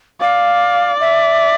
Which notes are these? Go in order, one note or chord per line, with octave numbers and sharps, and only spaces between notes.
D5 F5
E5